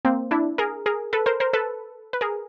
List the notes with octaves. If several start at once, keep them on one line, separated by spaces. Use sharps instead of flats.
A#3 C4
D4 E4
G#4 A#4
G#4 A#4
A4 B4
A#4 C5
A#4 C5
A4 B4
B4
G#4 A#4